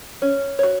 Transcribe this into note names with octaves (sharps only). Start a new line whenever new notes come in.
C#4
F#4 C#5